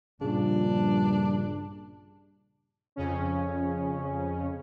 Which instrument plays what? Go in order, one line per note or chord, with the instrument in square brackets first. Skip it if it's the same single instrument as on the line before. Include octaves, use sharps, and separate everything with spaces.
[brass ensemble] A#1 G2 [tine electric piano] A#2 C#3 [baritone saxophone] D4
[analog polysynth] F2 C#3 C#4